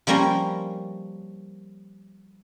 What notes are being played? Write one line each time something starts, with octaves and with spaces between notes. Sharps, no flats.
F3 G3 A#3 C#4 A#5 C6